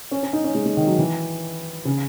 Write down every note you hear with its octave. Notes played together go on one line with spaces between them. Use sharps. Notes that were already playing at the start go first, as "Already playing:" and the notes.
C#4
C#4
D#4
C#4
G#3
G#3
D#3
F#3
E3
C#3